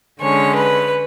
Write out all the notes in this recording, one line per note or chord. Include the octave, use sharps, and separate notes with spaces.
D3 G#3 C#4 C#5
B4